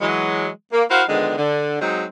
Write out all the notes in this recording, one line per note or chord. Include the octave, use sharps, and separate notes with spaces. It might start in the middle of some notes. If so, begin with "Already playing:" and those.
E3 F#3 G#3
A#3
E4 F#4 A#4 C5 F5
D3 D#3 F3 G#3 B3 D4
D3
F#3 G#3 C4 D#4